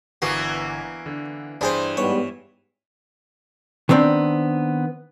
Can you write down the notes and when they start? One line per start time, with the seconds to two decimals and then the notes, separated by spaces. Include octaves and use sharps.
0.22 G1 E3 A#3 B3 F#4 F#5 C7
1.06 D3
1.61 G2 E3 D4 G#4 C5 G5 C6
1.97 G#2 G3 B3 C#5
3.89 D#3 B3 C4 D4